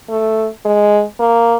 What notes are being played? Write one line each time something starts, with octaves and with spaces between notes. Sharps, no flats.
A3
G#3
A#3